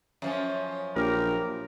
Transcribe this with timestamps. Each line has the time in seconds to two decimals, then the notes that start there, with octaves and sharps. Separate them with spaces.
0.22 F#2 F3 C#4
0.96 A#1 G4 A#4